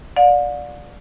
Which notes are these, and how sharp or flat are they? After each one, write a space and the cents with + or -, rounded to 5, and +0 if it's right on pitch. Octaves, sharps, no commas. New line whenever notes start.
D5 +0 F5 +45